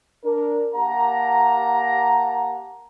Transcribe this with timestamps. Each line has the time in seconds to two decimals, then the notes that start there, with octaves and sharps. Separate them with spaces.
0.24 D4 A#4
0.74 A#3 G4 F#5 A5 A#5